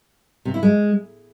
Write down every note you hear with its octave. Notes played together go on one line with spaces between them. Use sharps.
C3
E4
G#3